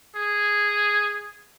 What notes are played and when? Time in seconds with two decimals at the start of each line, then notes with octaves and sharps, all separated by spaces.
0.15 G#4